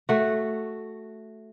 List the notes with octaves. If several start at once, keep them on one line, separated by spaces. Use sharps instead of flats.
A3 F#4